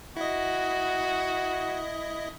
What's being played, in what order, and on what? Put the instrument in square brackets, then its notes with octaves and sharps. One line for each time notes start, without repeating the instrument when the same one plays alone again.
[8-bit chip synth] E4 D#5 [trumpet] F#4